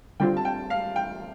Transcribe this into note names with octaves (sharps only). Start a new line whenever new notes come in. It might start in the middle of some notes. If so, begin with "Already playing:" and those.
D3 G3 C4 F4 G5
A5
G5
F5
G5